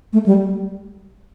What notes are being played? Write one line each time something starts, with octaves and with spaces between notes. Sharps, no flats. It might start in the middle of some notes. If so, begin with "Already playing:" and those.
A3
G3